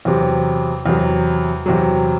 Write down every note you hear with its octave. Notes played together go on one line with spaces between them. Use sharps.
E2 C3 F#3
E2 C3 F#3
E2 C3 F#3